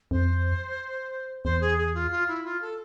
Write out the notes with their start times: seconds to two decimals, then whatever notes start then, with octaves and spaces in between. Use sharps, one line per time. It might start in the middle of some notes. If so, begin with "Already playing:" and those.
0.11 F2 C5
1.44 E2 C5
1.61 G#4
1.78 G#4
1.95 F4
2.11 F4
2.28 E4
2.45 F4
2.62 A4